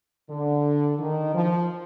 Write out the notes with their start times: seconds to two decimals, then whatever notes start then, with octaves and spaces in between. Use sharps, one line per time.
0.30 D3
0.99 D#3
1.34 F3